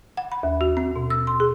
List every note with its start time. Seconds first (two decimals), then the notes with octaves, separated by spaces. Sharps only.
0.17 F#5
0.32 B5
0.43 D#2
0.61 F#4
0.77 C4
0.96 B2
1.10 E6
1.27 C6
1.40 G#4